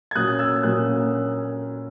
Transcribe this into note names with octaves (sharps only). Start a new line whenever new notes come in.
G#6
A#2 F#3 A#3 C#4 D#6 F#6
E6 G#6
A#2 F#3 A#3 C#4 D#6 F#6